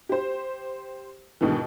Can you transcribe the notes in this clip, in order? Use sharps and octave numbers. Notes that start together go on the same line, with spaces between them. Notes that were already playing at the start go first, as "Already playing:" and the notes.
G4 C5
D#2 G#2 B2 D3 E3